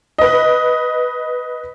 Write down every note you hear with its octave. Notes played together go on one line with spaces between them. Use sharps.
B4 D#5